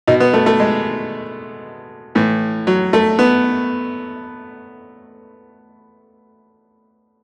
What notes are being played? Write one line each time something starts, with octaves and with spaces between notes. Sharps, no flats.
B2 D#4
B3
A3
A3
G#3
A2 E3
F#3
A3
B3